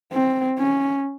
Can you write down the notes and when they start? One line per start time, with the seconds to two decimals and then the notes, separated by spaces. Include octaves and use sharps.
0.13 C4
0.58 C#4